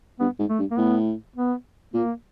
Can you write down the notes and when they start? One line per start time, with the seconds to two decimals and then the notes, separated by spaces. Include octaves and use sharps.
0.20 G2 B3
0.39 G#2
0.49 A3
0.59 G2
0.71 A#3
0.78 A2 B3
1.36 B3
1.94 A#2 A#3